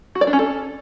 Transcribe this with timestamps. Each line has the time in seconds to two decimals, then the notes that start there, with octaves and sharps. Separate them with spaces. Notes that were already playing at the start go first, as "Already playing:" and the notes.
0.15 F#4
0.21 D5
0.27 D4
0.33 C#4
0.39 A4